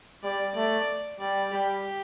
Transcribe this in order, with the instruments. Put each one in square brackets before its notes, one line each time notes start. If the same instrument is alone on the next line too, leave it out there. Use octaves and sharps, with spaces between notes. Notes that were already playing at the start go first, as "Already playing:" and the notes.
[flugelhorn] G3 [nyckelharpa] D5
[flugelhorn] A3 [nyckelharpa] D5
[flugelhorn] G3 [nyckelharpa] D5
[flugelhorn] G3 [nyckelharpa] G4